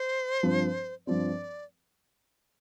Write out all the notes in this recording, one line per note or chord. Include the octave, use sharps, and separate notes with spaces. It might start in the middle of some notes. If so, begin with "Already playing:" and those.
Already playing: C5
G2 F3 C4
G2 F3 C4 D5